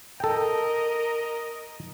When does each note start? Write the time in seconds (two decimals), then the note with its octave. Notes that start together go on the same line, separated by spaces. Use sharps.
0.20 A4 A#4 D#5 G5